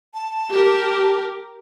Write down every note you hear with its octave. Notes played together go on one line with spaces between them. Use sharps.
A5
G4 A#4